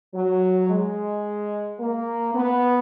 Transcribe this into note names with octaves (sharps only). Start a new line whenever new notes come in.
F#3
G#3
A#3
B3